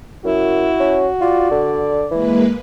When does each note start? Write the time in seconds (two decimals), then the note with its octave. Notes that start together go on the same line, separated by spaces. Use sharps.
0.25 F#2 E4 F#4
0.80 C#4
1.21 F4 D5
1.51 D3
2.11 E3 G#3 A#3 B4